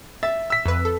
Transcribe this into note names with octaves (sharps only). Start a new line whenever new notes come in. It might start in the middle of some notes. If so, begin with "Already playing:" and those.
E5 A6
E6 B6
F2 B4
A4